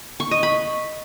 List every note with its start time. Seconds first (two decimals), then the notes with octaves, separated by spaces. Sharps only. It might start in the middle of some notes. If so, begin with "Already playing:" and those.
0.20 C#6
0.31 D#5
0.43 B5